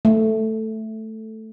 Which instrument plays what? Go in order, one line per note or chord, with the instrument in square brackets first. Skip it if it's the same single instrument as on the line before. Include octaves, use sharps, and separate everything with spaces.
[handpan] A3